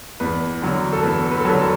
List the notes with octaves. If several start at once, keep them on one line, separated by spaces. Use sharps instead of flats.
E2 B4
D3 F#3
A4
E2 B4
B4
A4
D3 F#3 B4
A4